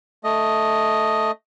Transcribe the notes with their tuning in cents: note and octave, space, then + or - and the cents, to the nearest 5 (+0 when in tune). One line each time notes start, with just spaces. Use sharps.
A3 +0 D#5 +0